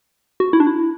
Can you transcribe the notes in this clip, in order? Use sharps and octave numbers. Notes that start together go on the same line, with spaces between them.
F#4
E4
D4
E4